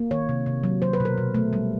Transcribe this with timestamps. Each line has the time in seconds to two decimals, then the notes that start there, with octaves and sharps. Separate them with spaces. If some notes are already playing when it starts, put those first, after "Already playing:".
Already playing: A#3
0.11 D#3 C#5
0.29 C3
0.46 C3
0.64 F#3
0.82 F#3 C5
0.93 B4
1.00 B2
1.05 A#4
1.18 B2
1.35 A3
1.53 G3